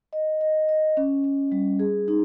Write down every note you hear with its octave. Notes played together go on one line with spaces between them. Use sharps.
D#5
D#5
D#5
C#4
C#4
G3
G#4
D#4